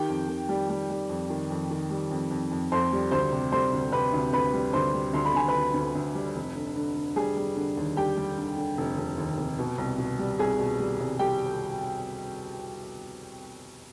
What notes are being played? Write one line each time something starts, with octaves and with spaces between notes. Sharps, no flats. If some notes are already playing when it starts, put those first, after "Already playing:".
Already playing: D#3 G4 G5
F2
D#3
G3
G3
G3
F2
D#3
F2
D#3
G3
F2
F2
F2
F2 C5 C6
G3
D2 C5 C6
C3
G3 C5 C6
D2
C3 B4 B5
D2
D2 B4 B5
G3
D2 C5 C6
G3
D2 C6
B5
D2 G#5
B4 B5
D2
D2
D2
G3
F1
D3
D3
D3
G3 G#4 G#5
G3
D3
D#2
G3 G4 G5
G3
D3
D3
F1
F1
D#2
F1
B2
C2
B2
G3
C2 G#4 G#5
B2
G3
C2
G3 G4 G5